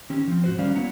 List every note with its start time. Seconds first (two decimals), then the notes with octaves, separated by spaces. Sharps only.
0.10 D#3 C4 C#4 G4
0.28 F3 C4
0.44 G#2 F#4 C5
0.58 D#3 G3 C#4 D5 F5
0.75 F#3 A#3 B3 E4 F#5 A#5